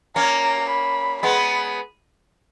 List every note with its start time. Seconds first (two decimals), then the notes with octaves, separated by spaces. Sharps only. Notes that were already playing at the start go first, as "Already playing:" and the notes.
0.16 A#3 C#4 A#5
0.70 B5
1.23 G#3 B3 B5